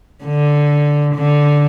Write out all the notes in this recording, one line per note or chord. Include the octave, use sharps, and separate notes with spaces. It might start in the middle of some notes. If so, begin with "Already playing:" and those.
D3
D3